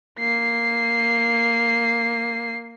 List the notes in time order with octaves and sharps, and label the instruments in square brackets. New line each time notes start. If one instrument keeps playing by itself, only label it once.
[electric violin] A#3 C7